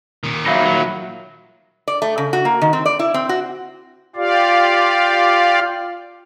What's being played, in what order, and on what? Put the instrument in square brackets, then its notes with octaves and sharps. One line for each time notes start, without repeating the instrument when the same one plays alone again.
[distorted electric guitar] A#2 D#3
[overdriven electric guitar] F#3 D#4 [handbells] E5 F5 B5
[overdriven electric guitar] F#3
[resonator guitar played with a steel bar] D5
A3
C#3
F#4
A#3
D#3
C4
D5
E4
C4
F#4
[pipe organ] F4 G4 D5 F5